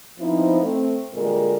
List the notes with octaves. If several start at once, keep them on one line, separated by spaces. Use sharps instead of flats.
F3 B3 C4 D#4 E4
A3 C4
D2 A#2 G3 G#3 A#4